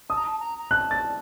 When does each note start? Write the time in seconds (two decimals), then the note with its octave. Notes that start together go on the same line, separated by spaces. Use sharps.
0.09 A5 D#6
0.17 A#5
0.26 A5
0.40 A#5
0.59 A#5
0.71 A5 F#6
0.91 A6